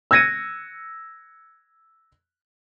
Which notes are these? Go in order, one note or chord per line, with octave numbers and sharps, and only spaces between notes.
E6 F#6 G#6 A#6 C#7 D#7